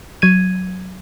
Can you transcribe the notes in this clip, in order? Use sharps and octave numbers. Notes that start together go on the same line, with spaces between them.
F#3 G#6 D#7